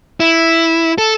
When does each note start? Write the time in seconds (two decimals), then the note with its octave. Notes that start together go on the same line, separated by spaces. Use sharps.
0.20 E4
0.98 A4